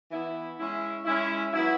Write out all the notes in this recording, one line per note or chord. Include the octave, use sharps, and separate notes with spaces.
E3 B3 E4
G#3 C#4 E4
G#3 C#4 E4
F#3 B3 E4